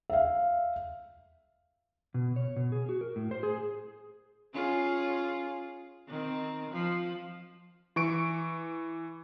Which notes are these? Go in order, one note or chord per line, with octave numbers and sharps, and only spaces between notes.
E5 F5
B2
C#5
B2
G#4
F#4
A#4
A2
C5
G#4
C#4 F4 G#4
D#3 C4
F3
E3 C#6 D7